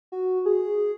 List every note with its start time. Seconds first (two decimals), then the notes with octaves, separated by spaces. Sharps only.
0.12 F#4
0.46 G#4